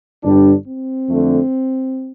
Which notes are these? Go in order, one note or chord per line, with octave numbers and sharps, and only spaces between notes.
G1 G2 G3 D4
C4
F2 D3 A3